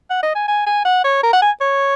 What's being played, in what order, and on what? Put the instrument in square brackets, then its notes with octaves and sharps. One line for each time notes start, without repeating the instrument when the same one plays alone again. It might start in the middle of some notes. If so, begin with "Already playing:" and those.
[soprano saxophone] F#5
D#5
G#5
G#5
G#5
F#5
C#5
A#4
F#5
G#5
C#5